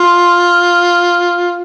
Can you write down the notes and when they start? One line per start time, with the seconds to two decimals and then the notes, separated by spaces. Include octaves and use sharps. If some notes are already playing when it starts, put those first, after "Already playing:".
Already playing: F4